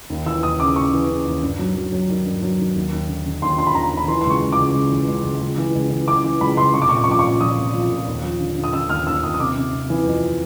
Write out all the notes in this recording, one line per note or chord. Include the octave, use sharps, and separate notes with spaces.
D#2
E3 E6
D#2 D#6
C#3 D6
C#3 C#6
E3
C#3
D#2
G2
F#3
F#3
F#3
D#3
G2
F#3
D#3
D#2
D#2
D3
D3
D#2 C6
D3 C6
B5
D#2 A#5
D#2
B5
E3 C6
C#2 C6
C#6
C#2
D6
C#2
C#2
E3
C#2
C#2
C#2
E3
C#2
E3
E3 D6
E3
C#2 B5
C#2 C6
C2 C#6
D6
A#2 C#6
D6
C#6
F3 D6
A#2 C#6
F3 D#6
C2
F3
A#2
D#2
F3
D3
D3
D#6
D3 E6
D#2 F6
D#2 E6
D#2 D#6
D#6
C3 D6
C3
C3
E3
F2